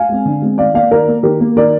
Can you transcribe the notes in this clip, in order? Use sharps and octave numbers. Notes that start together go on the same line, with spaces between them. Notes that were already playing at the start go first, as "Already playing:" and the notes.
Already playing: F5 G#5
G#3 C4
D3
G#3 C4
D#3 D5 F5
A#3 D5 F5
D#3 A#4 D5
A#3
D#3 G4 A#4
A#3
D#3 A#4 D5